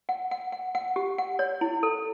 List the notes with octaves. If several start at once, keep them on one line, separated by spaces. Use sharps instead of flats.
F#5
F#5
F#5
F#5
G4
F#5
C#5
E4
A4